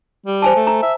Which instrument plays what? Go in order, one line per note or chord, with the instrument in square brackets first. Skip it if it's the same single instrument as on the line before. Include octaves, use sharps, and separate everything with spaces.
[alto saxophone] G3
[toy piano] C5 G#5 A5
[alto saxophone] A3
[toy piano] A#5
[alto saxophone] E5